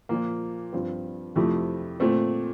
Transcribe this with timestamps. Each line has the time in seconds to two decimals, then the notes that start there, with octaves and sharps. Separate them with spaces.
0.09 A#2 F3 A#3
0.73 G2 F3 C4 F4
1.36 F2 C3 F3 A3 E4
2.00 A#2 A3 C4